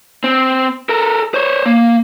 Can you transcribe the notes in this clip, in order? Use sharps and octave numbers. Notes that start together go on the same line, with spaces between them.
C4
A4 A#4
C5 C#5
A#3